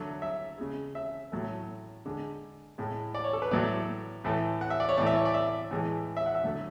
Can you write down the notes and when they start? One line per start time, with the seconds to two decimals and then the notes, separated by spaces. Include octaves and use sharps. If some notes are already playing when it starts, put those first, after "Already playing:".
Already playing: D3 F#3 A3
0.22 E5
0.58 C#3 G#3
0.95 E5
1.32 A2 F#3 A3
2.06 D3 G#3
2.78 A2 G#3
3.15 D5
3.24 C#5
3.33 A4
3.42 B4
3.51 A2 F#3 A3 D5
4.24 A2 E3 A3
4.61 F#5
4.70 E5
4.80 D5
4.89 C#5
4.97 A2 E3 A3 D5
5.06 E5
5.16 C#5
5.25 D5
5.34 E5
5.71 A2 E3 G#3
6.17 E5
6.26 F#5
6.35 E5
6.44 D3 F#3 A3